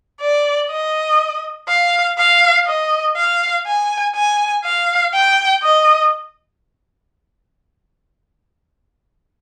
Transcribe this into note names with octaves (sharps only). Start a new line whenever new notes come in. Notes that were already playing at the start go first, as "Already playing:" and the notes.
D5
D#5
F5
F5
D#5
F5
G#5
G#5
F5
G5
D#5